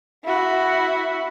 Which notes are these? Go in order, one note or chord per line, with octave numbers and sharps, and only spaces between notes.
E4 F#4